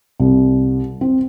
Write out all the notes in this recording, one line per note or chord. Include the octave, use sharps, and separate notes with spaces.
C2
C4